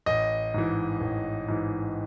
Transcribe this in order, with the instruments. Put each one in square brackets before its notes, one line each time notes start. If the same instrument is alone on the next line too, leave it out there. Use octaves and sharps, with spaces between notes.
[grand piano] A1 D#5
G#2 E3
A1
G#2 E3